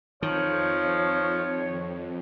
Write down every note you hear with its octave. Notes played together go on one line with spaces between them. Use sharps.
F2 D#3 F3 C#5